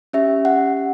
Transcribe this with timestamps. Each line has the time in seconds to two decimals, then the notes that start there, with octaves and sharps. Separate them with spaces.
0.13 C#4 G4 E5
0.45 F#5